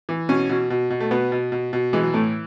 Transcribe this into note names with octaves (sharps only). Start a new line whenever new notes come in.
E3
B2 C#4
B2
B2
B2
A3
B2 B3
B2
B2
B2
E3 G#3
F#3
A2 A3